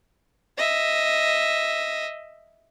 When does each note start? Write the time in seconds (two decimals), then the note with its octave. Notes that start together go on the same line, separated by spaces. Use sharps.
0.58 D#5 E5